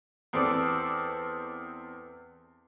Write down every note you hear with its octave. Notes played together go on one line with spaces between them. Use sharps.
E2 C4 A4 D5